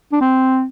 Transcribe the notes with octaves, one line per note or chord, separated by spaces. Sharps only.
D4
C4